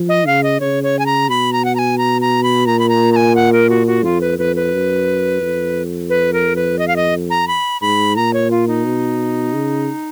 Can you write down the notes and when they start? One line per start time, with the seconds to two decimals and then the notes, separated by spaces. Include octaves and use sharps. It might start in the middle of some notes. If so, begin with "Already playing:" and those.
Already playing: F3
0.09 D#5
0.26 C#3 F5
0.43 D#5
0.60 C#3 C#5
0.84 C#5
0.99 G#5
1.06 A#5
1.29 B2 B5
1.53 A#5
1.65 F#5
1.75 A#5
1.79 G#5
1.98 A#5
2.21 A#5
2.43 B5
2.66 A#2 A#5
2.79 B5
2.89 A#5
3.12 A#5
3.16 G#5
3.36 F#5
3.53 A#4
3.70 F#4
3.87 F#4
4.04 F2 F4
4.21 B4
4.39 F2 B4
4.56 B4
4.73 F#2
5.42 F2
6.10 B4
6.33 A#4
6.56 B4
6.79 D#5
6.88 F5
6.96 D#5
7.30 A#5
7.48 B5
7.81 G#2 B5
8.16 A#2 A#5
8.33 C#5
8.51 F4
8.68 D#4
8.84 B2
9.53 C#3